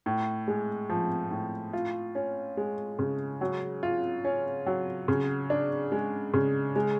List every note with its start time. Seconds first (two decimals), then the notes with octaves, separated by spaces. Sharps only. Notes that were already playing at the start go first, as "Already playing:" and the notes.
0.06 A2
0.48 G#3
0.90 F3
1.31 A2
1.73 F4
2.15 C#4
2.57 G#3
2.99 C#3
3.41 F#3
3.83 F4
4.25 C#4
4.66 F#3
5.08 C#3
5.50 D4
5.92 G#3
6.34 C#3
6.76 G#3